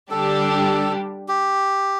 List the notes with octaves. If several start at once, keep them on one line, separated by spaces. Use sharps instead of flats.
D3 G3 D4 G4 A4
G4